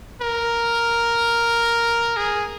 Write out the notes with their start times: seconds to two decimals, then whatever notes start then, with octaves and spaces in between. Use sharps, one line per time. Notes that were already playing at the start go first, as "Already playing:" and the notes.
0.21 A#4
2.17 G#4